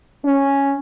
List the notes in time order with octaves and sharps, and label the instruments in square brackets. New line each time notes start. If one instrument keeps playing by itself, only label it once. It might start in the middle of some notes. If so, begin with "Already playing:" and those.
[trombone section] C#4